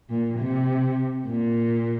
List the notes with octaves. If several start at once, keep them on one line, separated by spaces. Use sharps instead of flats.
A#2
C3
A#2